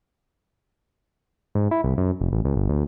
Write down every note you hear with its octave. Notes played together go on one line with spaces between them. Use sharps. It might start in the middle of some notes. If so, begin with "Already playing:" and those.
G#2
E4
C2
F#2
F1
A1
C#2
G1
D2